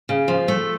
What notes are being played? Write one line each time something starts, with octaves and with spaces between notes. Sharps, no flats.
C#3
F3
A3